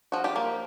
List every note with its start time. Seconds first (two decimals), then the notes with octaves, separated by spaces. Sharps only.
0.12 F3 F#4
0.24 F4 G4
0.36 A#3